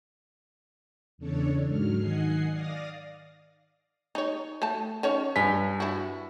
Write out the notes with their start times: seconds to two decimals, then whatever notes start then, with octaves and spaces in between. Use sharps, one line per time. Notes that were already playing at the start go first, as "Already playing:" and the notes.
1.18 E2 C#3 D4 A4 C#5
1.67 G#2 F#3 F6
1.97 D#3 D#5 F#5 G#5 C7
2.50 D5 F5 D#6 A#6
4.15 D#4 C#5
4.62 A3 A5
5.03 D#3 C#4 C#5
5.36 G2 F4 G#5 B6
5.80 E4 F#4